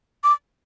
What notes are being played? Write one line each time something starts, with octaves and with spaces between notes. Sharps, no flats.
D6